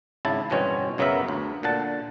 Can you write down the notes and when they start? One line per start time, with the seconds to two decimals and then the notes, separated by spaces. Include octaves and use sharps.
0.25 G#1 C#3 E4 A5
0.50 G1 E2 B2 C4 C#4 C#5
0.98 F#2 C#3 F#3 B3 A#4 E5
1.28 D2
1.63 A#2 D3 F#5 A5